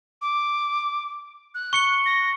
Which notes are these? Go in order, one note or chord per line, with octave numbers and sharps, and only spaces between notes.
D6
F#6
C#6 C#7 G7
A#6